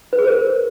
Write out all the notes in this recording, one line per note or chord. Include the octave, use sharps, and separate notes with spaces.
B4
G#4
C5
A#4